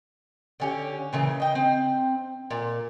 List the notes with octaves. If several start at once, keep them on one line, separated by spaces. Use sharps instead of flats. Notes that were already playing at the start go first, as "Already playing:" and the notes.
D3 C#4 G4
A#2 C#3 E3
D#5 G5
C4
A#2